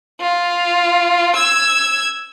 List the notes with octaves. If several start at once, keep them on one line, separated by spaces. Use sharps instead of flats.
F4
E6 G#6